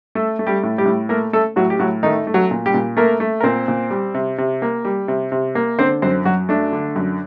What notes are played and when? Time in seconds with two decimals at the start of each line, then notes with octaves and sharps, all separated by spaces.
0.15 A3 A4
0.39 A3
0.47 G3 G4
0.63 A2
0.78 G3 G4
0.86 A2
1.09 A3 A#3 A#4
1.33 A3 A4
1.56 A2 F#3 F#4
1.70 G4
1.79 A2 F#3 F#4
2.03 D#3 A3 D#4
2.27 A3
2.34 F#3 F#4
2.51 A#2
2.66 G3 G4
2.74 A#2
2.97 A3 A#3 A#4
3.20 A3
3.40 A#4
3.44 A#2 C4 C5
3.68 A#2
3.90 G3
4.14 C3
4.38 C3
4.62 A#3
4.85 G3
5.08 C3
5.32 C3
5.55 A#3
5.79 D3 C4 C5
6.02 F#2 C4 C5
6.25 F#2 F#3 F#4
6.49 A3 D4
6.73 D3
6.96 F#2